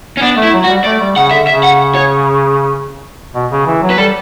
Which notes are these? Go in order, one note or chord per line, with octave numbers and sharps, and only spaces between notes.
C#4
B3 D4
A3
E4
F#3
F#4
G3
A3 D5
G3
C#3 F#5
D3 E5
C#3 E5
F#5
C#5
B2
C#3
E3
F#3
B4
G3 A4